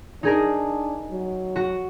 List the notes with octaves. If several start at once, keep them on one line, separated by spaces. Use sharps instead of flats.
D4 D#4 G#4 A#4
F#3
F#4